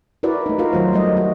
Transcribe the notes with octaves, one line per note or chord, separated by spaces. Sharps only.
E4 F#4 A#4 B4 D5
A3 D#4
F4 F#4 A#4 F5
D#3 F#3 A3 C5
G3 A3 D#5
F#4